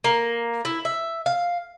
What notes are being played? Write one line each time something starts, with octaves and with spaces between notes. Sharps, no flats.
A#3
E4
E5
F5